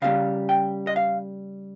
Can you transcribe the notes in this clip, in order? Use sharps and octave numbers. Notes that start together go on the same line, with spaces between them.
C#3 G3 A#3 F5
G5
D#5
F5